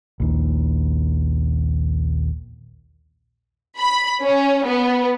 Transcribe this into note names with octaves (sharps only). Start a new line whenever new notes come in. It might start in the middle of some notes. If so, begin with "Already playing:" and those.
A#1 D#2
B5
C#4
B3